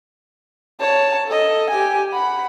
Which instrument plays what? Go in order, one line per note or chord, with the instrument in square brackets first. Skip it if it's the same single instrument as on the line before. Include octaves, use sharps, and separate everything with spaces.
[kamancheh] C#5 A5
A4 D#5
G4 G#5
F#5 B5